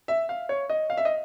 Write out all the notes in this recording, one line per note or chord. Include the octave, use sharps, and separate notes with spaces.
E5
F5
C#5
D#5
F5
E5
D#5